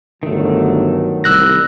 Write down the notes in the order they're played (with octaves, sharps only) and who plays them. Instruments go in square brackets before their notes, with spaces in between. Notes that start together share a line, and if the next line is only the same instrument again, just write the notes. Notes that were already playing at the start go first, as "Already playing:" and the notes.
[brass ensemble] G1 D2 F#3 [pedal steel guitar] D#3 A3
[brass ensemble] C2 G3 [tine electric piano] E6 F#6 A#6